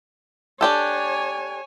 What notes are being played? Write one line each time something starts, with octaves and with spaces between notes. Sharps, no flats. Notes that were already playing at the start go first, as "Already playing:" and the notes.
D4 G4 A4 C#5 G#5